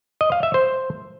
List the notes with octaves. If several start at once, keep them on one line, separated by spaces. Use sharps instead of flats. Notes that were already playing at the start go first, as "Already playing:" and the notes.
D#5
F5
E5
C5